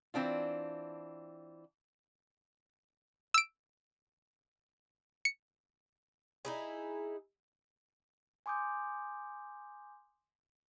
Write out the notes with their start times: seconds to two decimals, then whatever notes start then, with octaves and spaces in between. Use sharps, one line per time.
0.14 E3 C4 D4 F4
3.34 E6 D7
5.25 C#7
6.45 D#4 E4 G#4
8.46 G#5 C6 D6 D#6 G6